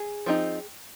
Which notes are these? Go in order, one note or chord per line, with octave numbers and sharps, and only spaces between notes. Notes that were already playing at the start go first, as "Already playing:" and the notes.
Already playing: G#4
F3 C4 D#4